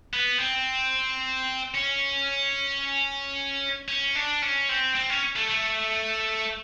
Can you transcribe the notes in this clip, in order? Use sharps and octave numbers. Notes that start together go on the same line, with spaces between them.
B3
C4
C#4
C#4
D4
C#4
C4
C4
C#4
A3
A3